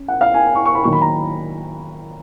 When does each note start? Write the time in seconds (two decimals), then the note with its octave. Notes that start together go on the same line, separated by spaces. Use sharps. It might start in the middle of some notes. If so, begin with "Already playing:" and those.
Already playing: C#4
0.08 F#5
0.21 F5
0.34 G#5
0.46 G#5
0.55 C#6
0.65 C#6
0.75 B5
0.83 D#3 F#3 A#3 D#4 C#6
0.92 B5
1.02 A#5